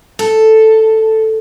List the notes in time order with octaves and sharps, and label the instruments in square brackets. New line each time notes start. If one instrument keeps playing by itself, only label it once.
[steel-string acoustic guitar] A4